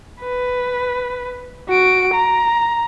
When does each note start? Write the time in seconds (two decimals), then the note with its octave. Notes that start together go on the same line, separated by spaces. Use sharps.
0.21 B4
1.69 F#4 D7
2.14 A#5